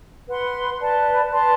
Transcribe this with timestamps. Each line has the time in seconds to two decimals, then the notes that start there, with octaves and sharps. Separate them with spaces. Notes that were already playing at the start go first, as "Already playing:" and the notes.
0.29 B4 F#5 C6
0.80 B4 D5 A5
1.31 B4 D5 A5 C6